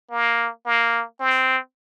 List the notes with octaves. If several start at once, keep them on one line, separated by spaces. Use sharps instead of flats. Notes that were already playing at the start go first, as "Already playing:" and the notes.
A#3
A#3
C4